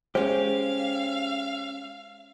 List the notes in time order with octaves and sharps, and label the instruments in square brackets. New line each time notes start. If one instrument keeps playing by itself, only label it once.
[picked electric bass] G#3 [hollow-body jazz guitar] C#4 G4 [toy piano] C5 [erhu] F5